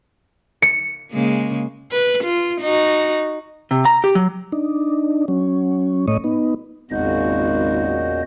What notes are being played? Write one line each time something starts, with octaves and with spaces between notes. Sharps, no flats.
C#7
C#3 G#3 A#3
B4
F4
D#4 F#4
C3
A#5
G4
F#3
D4 D#4
F#3 C#4
A2 A3 C#5 D#5
B3 D#4
G#1 E2 A#2 C#3 F#4 D#5 G6